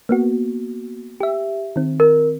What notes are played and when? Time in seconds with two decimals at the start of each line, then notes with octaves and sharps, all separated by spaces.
0.09 A#3 B3 F#4
1.20 G4 E5
1.76 D#3 C4
2.00 A#4